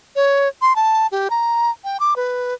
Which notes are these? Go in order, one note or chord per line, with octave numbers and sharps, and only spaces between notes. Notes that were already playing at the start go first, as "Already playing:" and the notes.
C#5
C6
A5
G4
A#5
G5
D6
B4